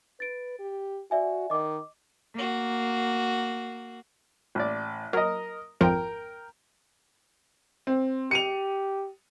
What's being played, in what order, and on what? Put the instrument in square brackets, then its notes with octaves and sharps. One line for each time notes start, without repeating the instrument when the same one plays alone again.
[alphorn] B4 [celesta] A6 D7
[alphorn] G4
[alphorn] F#4 [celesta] D5 E5 G#5
[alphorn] D#3 [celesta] D#5 D6
[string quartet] A#3 F#4
[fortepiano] A1 D5
[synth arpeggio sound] F#3 [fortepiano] A#4 D#5
[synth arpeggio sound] G#1 F2 F3 [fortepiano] A#4 G5
[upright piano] C4
[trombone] G4 [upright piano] C#7 D#7 F7